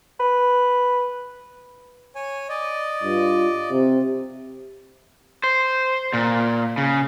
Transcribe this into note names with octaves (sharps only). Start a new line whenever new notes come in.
B4
C#5 G#5
D5 D#5
G2 F4
C3
C5
A#2
C#3